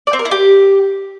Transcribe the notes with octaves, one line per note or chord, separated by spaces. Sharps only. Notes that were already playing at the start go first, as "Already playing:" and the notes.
D5
C4
A#4
E4
G4